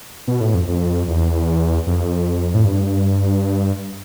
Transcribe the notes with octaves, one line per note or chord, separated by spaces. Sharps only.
B2
A2
F2
F2
E2
F2
A2
G2